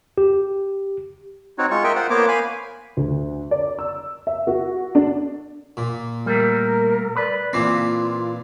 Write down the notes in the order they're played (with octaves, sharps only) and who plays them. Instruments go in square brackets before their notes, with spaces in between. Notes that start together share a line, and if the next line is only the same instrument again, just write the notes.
[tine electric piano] G4
[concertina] C4 D#4 F#4 C#5
G#3 F4 C#6
A#4 D#5 E5 G5
F4 C5 F#5
A#3 B3 A#4 C5 C#5 D6
F5 G#5 B5
[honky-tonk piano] D2
D5
E6
E5
F#4
D4
[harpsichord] A#2
[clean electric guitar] G3 A3 [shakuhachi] A#4
[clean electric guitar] B4 [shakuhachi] D5
[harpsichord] A#2 E3 D4 [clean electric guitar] C4 [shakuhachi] F4